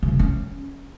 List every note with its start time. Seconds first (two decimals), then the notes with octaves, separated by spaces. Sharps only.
0.03 C#3
0.08 F3
0.14 E3
0.19 C#4